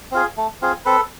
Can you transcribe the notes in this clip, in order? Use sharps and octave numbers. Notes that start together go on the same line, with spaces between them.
C4 F4 G#4
A3
C4 F4 G#4
C4 A4 B4